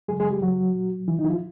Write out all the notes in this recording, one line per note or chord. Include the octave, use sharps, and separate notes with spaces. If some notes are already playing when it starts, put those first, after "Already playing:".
F#2 C#3 F#3 G#3 G#4
G#3 G#4
G3 G4
F#3 F#4
A#2 F#3
E3 E4
D#3 D#4
E4
F3 F4